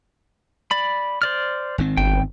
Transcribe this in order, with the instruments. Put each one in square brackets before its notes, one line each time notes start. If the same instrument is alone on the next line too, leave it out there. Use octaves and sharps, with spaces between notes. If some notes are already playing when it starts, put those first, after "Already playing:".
[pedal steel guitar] D5 B5
C5 D5 F6
[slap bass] G#1 D#3 C4
[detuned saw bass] G1 [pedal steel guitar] G5